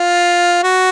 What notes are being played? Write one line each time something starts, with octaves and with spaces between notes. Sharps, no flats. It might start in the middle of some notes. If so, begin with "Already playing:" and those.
Already playing: F4
F#4